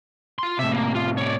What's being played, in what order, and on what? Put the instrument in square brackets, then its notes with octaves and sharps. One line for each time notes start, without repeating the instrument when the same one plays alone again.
[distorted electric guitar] F4 C6
[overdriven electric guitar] A2 C3 [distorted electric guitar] E5
[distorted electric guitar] A#3
F4
C#5 D5